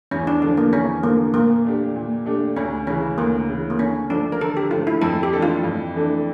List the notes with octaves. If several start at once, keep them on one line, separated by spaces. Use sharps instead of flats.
E2 C#4
D4
D3 F3 D4
A#3
E2 C#4
D3 F3 A#3
A#2 A#3
A3 D4 G4
A#2
A3 D4 G4
D2 C#4
C#3 E3 C#4
D2 A#3
C#3 E3
A#3
D3 C#4
F3 A3 D4
A#4
D3 A4
G4
F3 A3 F4
E4
F2 A4
G4
E3 A3 D4 A4
F4
F2
E3 A3 D4 A4